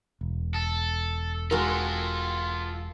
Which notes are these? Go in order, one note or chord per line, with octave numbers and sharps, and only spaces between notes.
E1
A4
G#3 F4 F#4 A4 A#4